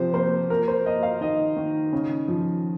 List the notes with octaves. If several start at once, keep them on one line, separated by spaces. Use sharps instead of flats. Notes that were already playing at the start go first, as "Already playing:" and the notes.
Already playing: C3 F3 C5
A#3 C5
A#3 A#4
C5
A#3 D#5
F5
D#3 D#5
D#3
C#3
F3